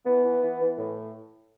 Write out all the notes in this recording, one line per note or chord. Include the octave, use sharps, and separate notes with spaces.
E3 B3
E3
E3
E3
A2